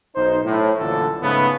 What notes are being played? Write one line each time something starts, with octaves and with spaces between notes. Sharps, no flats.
B1 D#4 C5
A2
A#1 F#2 A#2 D3 E3 A4
G#2 C#3 A3 B3